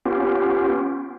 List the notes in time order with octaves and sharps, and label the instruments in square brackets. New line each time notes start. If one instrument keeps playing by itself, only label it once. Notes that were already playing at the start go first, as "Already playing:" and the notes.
[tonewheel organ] B3 C#4 F4 G4